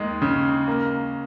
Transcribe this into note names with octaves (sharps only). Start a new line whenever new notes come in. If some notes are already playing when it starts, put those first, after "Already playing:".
Already playing: D#2 G#3
C#3
A#3